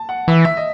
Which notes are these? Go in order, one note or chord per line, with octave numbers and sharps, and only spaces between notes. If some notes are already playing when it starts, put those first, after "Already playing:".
Already playing: A5
F#5
E3 E5
E5
D#5